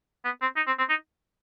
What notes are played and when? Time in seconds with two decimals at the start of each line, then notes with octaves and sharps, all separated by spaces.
0.24 B3
0.41 C4
0.56 D#4
0.67 C4
0.78 C4
0.89 D#4